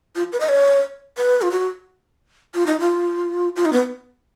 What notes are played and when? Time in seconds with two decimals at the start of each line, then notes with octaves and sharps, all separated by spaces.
0.16 F4
0.32 B4
0.41 D#5
0.49 C#5
1.17 B4
1.42 F4
1.51 F#4
2.54 F4
2.66 D#4
2.80 F4
3.56 F4
3.65 D#4
3.73 B3